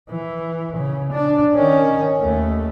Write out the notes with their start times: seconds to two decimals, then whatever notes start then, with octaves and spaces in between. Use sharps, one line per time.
0.10 E3
0.77 C#3
1.13 D4
1.56 D#3 C#4
2.20 D#2 A3